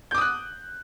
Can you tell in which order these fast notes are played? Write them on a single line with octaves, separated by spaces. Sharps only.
G6 D6 D#6 F#6